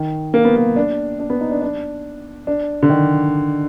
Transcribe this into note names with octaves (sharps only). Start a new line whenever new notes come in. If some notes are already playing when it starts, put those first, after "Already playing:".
Already playing: D#3
A#3
B3
A#3
D4
D4
B3
D#4
D4
D4
D4
D3
D#3